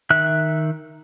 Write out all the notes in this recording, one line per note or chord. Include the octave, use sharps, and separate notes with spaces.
D#3 E5 F#6